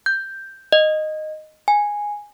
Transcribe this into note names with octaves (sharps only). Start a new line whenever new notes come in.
G6
D#5
G#5